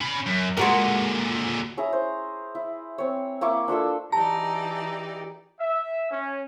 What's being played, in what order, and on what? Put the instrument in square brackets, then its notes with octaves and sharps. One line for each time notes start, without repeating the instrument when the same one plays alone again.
[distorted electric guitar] C#4 B5
F#2
[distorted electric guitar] A#2 D3 [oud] G#3 F#4 A#4
[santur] C#4 E4 G#4 A#5
C5
E4
C4 C#5
A#3 E4 C#6 D6
D4 F4 A4 E6
[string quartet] E3 D#4 D5 [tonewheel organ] G4 [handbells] A5 [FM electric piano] A#5
[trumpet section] E5
C#4